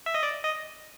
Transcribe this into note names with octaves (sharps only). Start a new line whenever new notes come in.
E5
D#5
D5
D#5